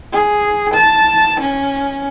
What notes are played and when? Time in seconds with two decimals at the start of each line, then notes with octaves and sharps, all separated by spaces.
0.13 G#4
0.74 A5
1.40 C#4